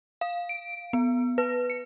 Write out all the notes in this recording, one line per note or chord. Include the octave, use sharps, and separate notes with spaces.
F5
D7
B3
B4
C#7